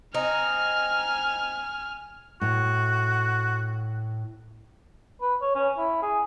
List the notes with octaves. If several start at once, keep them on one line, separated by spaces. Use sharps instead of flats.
C4 D#4 G#5 F6
A2 F#4
B4
C#5
C#4
E4
G#4